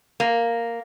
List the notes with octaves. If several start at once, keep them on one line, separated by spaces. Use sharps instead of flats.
A#3